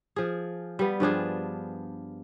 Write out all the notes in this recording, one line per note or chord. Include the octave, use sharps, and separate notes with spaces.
F3 G#4
G3 B3
G2 F3 D4 G#4